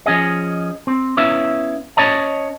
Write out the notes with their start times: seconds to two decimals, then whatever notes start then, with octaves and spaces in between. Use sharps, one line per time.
0.06 F3 C#4 G#4 D#5
0.87 C4
1.17 B3 C#4 E4 E5 F5
1.97 C#4 C#5 D#5 A5